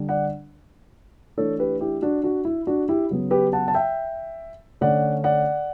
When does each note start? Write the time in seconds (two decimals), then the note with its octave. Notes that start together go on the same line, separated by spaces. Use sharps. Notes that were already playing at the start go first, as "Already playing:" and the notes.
Already playing: D3 G3 D4
0.09 D5 F#5
1.37 E3 A3 D4 A4 C#5
1.59 G4 B4
1.81 E4 G4
2.02 D4 F#4
2.24 D4 F#4
2.45 E4
2.67 D4 F#4
2.89 E4 G4
3.10 C#3 F#3 B3
3.31 G4 B4
3.53 F#5 A5
3.68 A5
3.75 E5 G5
4.81 D3 A3 C#4 D5 F#5
5.24 D5 F#5